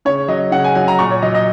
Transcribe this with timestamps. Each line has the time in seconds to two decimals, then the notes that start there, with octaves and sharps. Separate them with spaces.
0.05 C#3 C#5
0.28 F#3 D#5
0.52 C#3 F#5
0.64 G#5
0.75 F#3 G#5
0.88 A#5
0.99 A#2 C#6
1.11 C#5
1.22 F#3 D#5
1.35 D#5